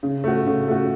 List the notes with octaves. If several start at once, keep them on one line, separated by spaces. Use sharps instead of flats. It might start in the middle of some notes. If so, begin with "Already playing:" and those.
C#3
A3 F#4
C#3
A3 F#4